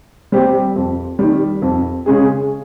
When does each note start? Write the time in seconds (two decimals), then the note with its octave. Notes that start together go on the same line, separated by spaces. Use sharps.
0.32 G3 C4 G4
0.76 F2
1.19 D#3 G3
1.62 F2
2.06 C#3 G#3 C#4 G#4